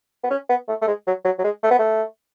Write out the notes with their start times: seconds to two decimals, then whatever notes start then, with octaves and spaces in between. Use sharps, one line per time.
0.24 B3
0.31 C#4
0.50 B3
0.68 A3
0.82 A3
0.87 G#3
1.07 F#3
1.25 F#3
1.39 F#3
1.44 G#3
1.63 A3
1.71 B3
1.79 A3